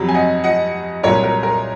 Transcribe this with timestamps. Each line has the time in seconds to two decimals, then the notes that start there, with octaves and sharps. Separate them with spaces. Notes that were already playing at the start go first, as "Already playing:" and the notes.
Already playing: F2 C3 F#3
0.09 G#5
0.14 D#5 F#5
0.44 D#5 F#5
1.03 C2 A#2 F#3 A#4 C#5
1.24 A#4
1.43 A#4